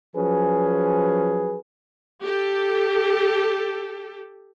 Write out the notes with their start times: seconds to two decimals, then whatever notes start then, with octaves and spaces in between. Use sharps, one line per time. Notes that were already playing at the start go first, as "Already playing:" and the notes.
0.16 F3 F#3 C#4 G#4 B4
2.22 G4 A4